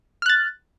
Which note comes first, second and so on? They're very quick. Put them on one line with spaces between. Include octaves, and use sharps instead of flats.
F6 F#6 A6